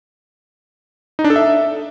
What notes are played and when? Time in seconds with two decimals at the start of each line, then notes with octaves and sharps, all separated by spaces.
1.19 D#4
1.24 D4
1.30 A4
1.36 E5